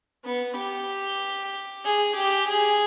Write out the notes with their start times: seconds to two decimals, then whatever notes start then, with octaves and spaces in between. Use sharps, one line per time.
0.25 B3
0.57 G4
1.85 G#4
2.16 G4
2.48 G#4